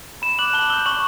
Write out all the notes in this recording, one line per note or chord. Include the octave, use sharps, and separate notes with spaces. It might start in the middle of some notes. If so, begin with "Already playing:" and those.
B5 E7
D6 F#6 F#7
A5 G7
E6 G6 G7
C#6 F#7